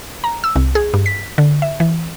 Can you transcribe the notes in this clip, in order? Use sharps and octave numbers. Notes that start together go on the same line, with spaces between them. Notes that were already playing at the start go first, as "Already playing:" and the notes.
A#5
E6
C2
G#4
G2
B6
D3
E5
E3